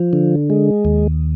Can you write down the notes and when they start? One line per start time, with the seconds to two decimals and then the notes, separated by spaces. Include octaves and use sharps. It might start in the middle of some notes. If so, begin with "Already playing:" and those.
Already playing: F3
0.13 D3
0.50 G#3
0.85 D#2